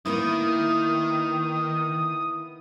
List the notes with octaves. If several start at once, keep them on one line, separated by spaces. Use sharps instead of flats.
D#3 A#3 B3 E4 D#6